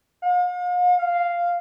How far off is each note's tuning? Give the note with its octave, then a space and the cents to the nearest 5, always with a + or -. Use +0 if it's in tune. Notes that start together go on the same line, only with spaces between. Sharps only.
F5 +45
F5 -5